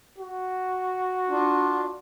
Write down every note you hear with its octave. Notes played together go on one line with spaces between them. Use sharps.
F#4
D4 F4